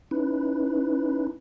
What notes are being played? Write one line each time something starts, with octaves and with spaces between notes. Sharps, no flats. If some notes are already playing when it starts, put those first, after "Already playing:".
C#4 D#4 E4 B4